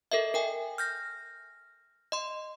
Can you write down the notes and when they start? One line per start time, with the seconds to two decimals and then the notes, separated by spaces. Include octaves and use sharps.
0.12 A4 A#4 D#5 E5
0.34 A#4 G5 G#5
0.78 F6 G6 A#6
2.12 D#5 C6